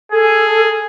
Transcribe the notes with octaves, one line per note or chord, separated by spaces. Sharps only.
G#4 A4